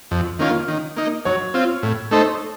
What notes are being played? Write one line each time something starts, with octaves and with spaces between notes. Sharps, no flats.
F2
D#3 A#3 C#4 F4
D#3
A#3 D#4
F#3 C#5
C4 F4
A2
A3 D#4 A4 C5